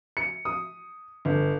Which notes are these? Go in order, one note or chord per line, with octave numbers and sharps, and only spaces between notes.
C#7
D#6
G1